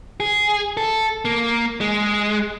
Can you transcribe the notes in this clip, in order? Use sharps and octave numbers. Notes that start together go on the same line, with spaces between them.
G#4
A4
A#3
G#3